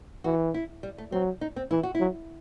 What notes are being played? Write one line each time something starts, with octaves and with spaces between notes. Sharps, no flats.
E3 F#4
E4
G3
A3
F#3 C4
D#4
C4
E3 E4
F#4
E4
F#3